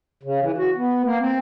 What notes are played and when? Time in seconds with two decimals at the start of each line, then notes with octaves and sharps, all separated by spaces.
0.23 C#3
0.41 E3
0.58 F#4
0.76 B3
1.05 A#3
1.20 C4